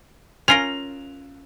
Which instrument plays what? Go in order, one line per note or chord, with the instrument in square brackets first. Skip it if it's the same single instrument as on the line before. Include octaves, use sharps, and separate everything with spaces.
[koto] C#4 F4 A#4 [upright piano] F7